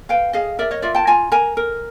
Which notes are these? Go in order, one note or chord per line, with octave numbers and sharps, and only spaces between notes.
B4 F5 G5
G#4 D#5 F5
A#4 D5 E5
C#5 D#5
F4 D5 E5
G5 A5
F4 G#5 A#5
A#4 G#5 A#5
A#4